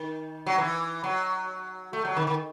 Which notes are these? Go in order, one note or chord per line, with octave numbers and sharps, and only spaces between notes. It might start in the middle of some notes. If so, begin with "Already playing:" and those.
Already playing: D#3
F#3
E3
F#3
A3
F#3
D#3
D#3